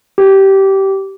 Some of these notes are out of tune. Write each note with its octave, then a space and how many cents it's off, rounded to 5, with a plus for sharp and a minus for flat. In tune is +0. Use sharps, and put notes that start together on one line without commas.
G4 -15